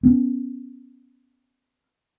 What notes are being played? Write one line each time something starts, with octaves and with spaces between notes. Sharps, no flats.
B3 C#4